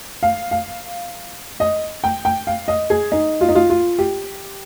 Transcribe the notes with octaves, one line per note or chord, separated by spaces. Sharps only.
F5
F5
D#5
G5
G5
F5
D#5
G#4
D#4
F4
D#4
F4
F4
G4